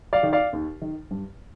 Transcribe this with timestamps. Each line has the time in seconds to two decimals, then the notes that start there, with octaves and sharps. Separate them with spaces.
0.13 D5 F5
0.23 D#3
0.33 D5 F5
0.53 D#2
0.82 D#3
1.11 G2